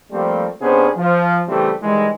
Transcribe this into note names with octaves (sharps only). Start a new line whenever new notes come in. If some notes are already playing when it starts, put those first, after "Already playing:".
F3 G3 A3 A#3 C4 G4
C3 B3 C#4 D4 G#4 C5
F3
C#3 E3 G3 A3 C4 G4
D#3 E3 G3 G#3